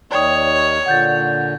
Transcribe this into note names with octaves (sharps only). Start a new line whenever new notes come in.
D#2 D#3 C#5 D5 G5 D#6
A#2 D3 F#5 G6 A6